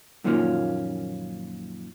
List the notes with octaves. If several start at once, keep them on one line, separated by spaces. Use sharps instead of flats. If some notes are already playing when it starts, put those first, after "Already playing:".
F#2 A#2 D#3 F3 A#3 C#4